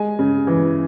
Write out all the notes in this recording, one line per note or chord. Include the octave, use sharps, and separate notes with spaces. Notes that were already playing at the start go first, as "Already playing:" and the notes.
Already playing: G#3 G#5
C#3
E3